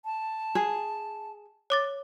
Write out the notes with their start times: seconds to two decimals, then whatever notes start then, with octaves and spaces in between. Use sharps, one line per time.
0.05 A5
0.55 G#4
1.70 C#5 D6 A6